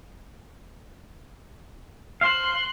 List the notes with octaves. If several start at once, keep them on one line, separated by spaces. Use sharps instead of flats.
C5 F5 C6 F#6